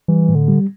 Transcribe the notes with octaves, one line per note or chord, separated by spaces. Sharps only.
E3 G3
A2
D3
G3